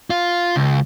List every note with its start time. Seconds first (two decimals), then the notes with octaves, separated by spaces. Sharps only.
0.10 F4
0.56 C#2